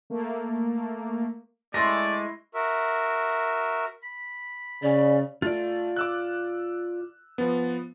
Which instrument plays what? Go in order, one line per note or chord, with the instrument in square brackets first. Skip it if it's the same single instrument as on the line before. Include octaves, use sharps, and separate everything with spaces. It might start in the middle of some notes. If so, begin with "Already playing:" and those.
[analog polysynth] A3 A#3
[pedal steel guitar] G#3 [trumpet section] A3 E4 [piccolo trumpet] D5 [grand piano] C6 A#6
[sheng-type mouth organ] F#4 A#4 E5
B5
[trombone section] C#3 [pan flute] D5
[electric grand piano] A3 [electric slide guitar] F4 D5
[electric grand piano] D6 E6 F#6
F3 B3